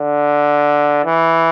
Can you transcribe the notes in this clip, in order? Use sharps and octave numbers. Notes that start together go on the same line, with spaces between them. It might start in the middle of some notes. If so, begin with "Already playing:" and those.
Already playing: D3
E3